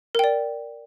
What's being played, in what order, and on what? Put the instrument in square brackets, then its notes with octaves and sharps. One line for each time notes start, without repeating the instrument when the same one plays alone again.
[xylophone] A#4
G5
D5